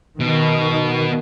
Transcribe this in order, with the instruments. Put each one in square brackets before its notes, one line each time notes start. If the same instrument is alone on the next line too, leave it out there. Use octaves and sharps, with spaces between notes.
[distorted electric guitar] B2 [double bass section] D#3